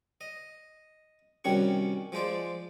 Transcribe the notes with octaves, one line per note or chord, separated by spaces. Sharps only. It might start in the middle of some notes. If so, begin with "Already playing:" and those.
D#5
C2 D#3 G3 C#4 F#4 C#6
F3 G#3 C5 D5